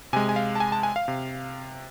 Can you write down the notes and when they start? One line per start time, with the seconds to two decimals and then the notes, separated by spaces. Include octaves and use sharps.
0.13 C3 G#3 G#5
0.29 G#5
0.36 F5
0.55 A5
0.60 G#5
0.72 A5
0.83 G#5
0.96 F5
1.08 C3